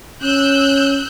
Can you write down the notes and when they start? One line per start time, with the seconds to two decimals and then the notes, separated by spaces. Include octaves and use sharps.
0.23 C#4 E6 F#6 G6